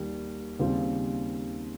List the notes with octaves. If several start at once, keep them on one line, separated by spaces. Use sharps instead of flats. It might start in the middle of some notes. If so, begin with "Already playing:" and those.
Already playing: D#2 D#3 G3
D#2 C#3 G3 C4 F4